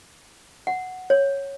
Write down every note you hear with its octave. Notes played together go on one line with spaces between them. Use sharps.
F#5
C#5